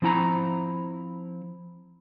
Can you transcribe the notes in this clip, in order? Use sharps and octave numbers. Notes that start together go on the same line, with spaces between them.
F3 C4 E4 G5 A#5